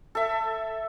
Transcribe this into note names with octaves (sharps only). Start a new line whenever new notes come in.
A4 E5